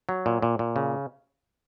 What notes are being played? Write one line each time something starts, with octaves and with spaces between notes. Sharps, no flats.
F#3
A#2
A#2
A#2
C#3